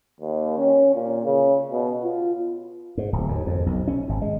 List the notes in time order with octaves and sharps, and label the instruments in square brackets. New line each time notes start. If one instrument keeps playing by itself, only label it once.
[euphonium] D#2
C#4
A#2
C#3
B2
F4
[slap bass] G#2
D1
D#2
F2
B1
C#4
G#1
G#3